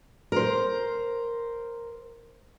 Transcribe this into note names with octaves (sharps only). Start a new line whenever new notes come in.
A#4 C5